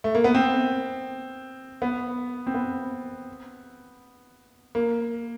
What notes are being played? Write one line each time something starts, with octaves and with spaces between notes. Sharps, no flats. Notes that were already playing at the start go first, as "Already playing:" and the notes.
A3
A#3
B3
C4
B3
C4
B3
A#3